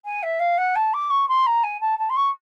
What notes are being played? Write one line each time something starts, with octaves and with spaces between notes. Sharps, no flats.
G#5
E5
F5
F#5
A5
D6
C#6
C6
A#5
G#5
A5
A5
C6
C#6